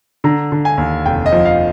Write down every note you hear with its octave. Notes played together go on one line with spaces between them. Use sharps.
D3 A#5
D3
G#5
D#2
F1 G5
D#5
F3
F5